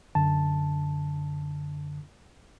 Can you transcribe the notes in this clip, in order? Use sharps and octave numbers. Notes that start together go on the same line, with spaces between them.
F#2 D3 A5